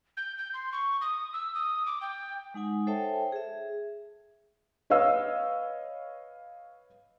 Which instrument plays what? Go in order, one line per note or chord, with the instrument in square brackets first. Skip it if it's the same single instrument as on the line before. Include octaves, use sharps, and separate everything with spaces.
[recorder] G6
G6
C6
C#6
D#6
E6
D#6
D6
G5
[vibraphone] G#3 D#4 F#5 G#5
A4 C5 C#5 E5 G5 A5
G#4 E5
[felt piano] B4 C#5 D#5 F5 E6